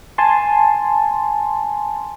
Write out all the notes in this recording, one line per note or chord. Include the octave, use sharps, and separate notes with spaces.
G#5 A5 C6